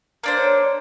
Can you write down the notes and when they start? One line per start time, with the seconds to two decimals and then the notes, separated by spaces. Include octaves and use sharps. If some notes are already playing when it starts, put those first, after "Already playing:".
0.24 A#3 D4 C5
0.38 C#5